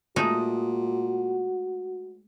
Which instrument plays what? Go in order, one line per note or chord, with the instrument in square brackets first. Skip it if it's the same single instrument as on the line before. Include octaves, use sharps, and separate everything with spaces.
[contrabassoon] A#2 [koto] G#3 A3 D#4 [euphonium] F#4